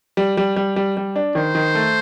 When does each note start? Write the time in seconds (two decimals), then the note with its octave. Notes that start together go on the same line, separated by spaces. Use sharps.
0.17 G3
0.37 G3
0.56 G3
0.76 G3
0.97 G3
1.16 D4
1.35 D#3 C5
1.55 D#3
1.75 A3